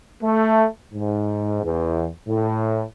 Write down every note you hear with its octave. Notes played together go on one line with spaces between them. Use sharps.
A3
G#2
E2
A2